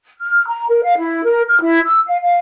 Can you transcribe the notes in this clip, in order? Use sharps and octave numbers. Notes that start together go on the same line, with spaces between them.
F6
A#5
A#4
F5
E4
A#4
F6
E4
E6
F5
F5